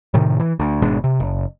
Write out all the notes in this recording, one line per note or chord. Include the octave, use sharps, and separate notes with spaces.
A2 C3 D#3
E3
D2
G#1 B2 G#3 D4
C3
F#1